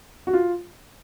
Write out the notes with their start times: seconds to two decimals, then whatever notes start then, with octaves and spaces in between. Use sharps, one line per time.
0.27 F#4
0.33 F4